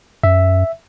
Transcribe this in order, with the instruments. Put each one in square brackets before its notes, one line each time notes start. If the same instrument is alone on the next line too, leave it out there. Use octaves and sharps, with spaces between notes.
[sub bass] F#2 [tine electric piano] E5